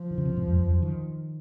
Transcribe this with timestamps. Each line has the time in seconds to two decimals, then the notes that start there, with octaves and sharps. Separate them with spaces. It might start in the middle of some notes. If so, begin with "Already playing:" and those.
Already playing: F3
0.11 D#3
0.18 C#3
0.25 C3
0.37 G#2
0.47 F2
0.60 F2
0.71 F#2
0.82 D#3